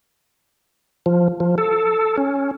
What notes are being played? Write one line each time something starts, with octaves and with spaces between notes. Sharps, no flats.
F3
F3
A4
C#4